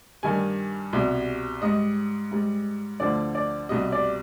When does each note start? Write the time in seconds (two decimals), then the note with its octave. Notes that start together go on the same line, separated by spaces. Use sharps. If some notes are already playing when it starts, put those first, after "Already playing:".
0.23 G2 D#3 G3 G#5
0.93 C2 B2 G3
1.62 G#2 G3 D#5
2.32 G#2 G3
3.00 D2 D3 F3 D5
3.35 D5
3.69 C2 B2 G3 D#5
3.92 D5